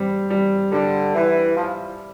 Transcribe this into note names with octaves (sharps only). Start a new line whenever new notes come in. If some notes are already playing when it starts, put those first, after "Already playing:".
Already playing: G3 C4
G3
D3 G3
E3 E4
F3 E4